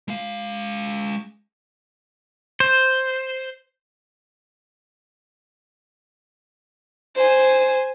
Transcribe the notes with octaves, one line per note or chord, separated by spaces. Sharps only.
G#3 F5
C5
C5 G#5